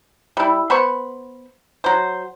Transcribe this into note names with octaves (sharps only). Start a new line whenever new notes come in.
G3 E4
B3 C5 B5 C#6
F#3 C5